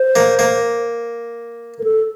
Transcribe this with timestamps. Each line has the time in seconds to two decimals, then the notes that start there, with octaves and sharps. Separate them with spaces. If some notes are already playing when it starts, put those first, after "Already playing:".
Already playing: C5
0.16 A#3
0.39 A#3
1.79 A#4
1.84 A4